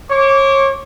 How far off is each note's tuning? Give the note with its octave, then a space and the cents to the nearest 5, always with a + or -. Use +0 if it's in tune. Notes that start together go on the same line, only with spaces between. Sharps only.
C#5 -30 D6 -25